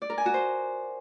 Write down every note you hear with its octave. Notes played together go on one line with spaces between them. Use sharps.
D5
A#4
G#5
F#4
C5